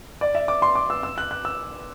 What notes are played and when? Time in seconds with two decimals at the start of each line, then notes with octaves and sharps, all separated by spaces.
0.21 D5
0.35 E5
0.48 D6
0.62 C6
0.75 D6
0.90 E6
1.03 E6
1.18 F#6
1.31 F#6
1.45 E6